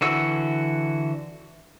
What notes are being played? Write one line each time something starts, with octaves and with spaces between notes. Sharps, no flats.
D3 E3 F#4 E6